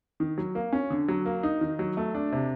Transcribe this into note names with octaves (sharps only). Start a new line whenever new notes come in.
D#3
F#3
A#3
C#4
D3
F#3
A#3
D#4
D#3
F#3
A3
D4
C3